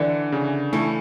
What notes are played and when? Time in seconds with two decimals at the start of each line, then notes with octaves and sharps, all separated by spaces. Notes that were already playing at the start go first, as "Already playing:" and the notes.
Already playing: D3 E3
0.32 C#3
0.73 E3 A3